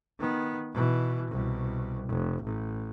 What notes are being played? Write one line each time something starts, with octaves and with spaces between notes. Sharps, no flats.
D#3 B3
B2 E3
C2 B2
F1
A1